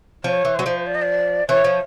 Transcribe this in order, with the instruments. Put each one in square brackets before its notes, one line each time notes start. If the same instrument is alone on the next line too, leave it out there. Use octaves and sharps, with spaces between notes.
[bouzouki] F3 [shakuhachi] C#5
[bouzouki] E3
[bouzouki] F#3 [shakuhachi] C5
[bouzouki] F3
[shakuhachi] D5
D#5
D5
[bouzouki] E3 [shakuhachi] C#5
[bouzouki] F3